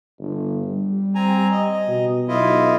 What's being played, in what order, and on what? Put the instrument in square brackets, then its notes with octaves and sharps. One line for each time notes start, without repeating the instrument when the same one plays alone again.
[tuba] G1
G3
[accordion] C4 G#5 A#5
D#5
[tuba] B2
[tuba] B1 [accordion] E4 F4 D#5